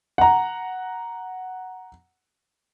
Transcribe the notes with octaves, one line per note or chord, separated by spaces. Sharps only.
F#5 A#5